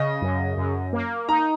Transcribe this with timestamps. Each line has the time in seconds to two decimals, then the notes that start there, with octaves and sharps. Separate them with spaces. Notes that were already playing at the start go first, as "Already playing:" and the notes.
Already playing: C#3 D#5
0.22 F#2
0.57 F#2
0.93 A#3
1.29 D#4 A#5